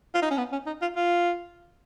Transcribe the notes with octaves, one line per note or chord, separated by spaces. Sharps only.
F4
D#4
C#4
B3
C#4
D#4
F4
F4